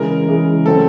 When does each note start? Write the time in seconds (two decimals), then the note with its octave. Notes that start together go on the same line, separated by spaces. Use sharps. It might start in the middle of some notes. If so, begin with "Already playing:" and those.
Already playing: C#3 E3 G#3 A#4
0.28 C#3 E3 G#3
0.66 C#3 F#3 A3 C4 A4